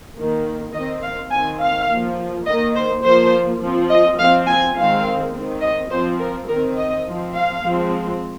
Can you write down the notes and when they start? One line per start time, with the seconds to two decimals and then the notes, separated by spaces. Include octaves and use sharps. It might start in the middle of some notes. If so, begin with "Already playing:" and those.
0.17 D#3 A#3
0.74 D#3 C4 D#5
1.02 F5
1.31 D#3 C4 G#5
1.61 F5
1.90 F3 A#3
2.46 D#3 A#3 D#5
2.75 C5
3.03 F3 A#3 C5
3.61 F3 C4
3.90 D#5
4.18 F3 C4 F5
4.48 G#5
4.76 D#3 G#3 C4 F5
5.34 D#3 C4
5.62 D#5
5.91 F3 C4 C5
6.19 A#4
6.47 D#3 A#4
6.51 C4
6.77 D#5
7.05 F3 C4
7.34 F5
7.62 F3 G#3 C4